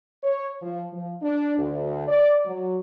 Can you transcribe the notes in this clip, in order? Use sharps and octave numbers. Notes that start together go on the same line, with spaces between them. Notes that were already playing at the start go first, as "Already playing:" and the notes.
C#5
F3
F3
D4
D2
D5
F#3